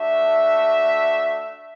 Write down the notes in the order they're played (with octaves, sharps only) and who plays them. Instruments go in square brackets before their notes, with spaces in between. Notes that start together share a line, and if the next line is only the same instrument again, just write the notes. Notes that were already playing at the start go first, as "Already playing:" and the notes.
Already playing: [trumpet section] A3 D4 F#4 E5